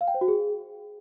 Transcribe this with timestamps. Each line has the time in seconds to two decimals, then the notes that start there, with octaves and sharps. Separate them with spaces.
0.01 F5
0.08 G5
0.14 C5
0.21 F#4
0.28 G#4